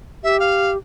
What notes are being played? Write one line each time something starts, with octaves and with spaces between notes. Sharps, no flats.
G4 E5
F5